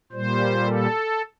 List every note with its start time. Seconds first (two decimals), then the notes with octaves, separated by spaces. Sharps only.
0.12 A#2 G3 C5
0.66 A4